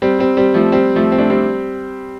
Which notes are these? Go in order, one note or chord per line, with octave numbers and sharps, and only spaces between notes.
G3 C4
G3 C4
G3 C4
F3 A3
G3 C4
F3 A3
C4
A3 D4
G3 C4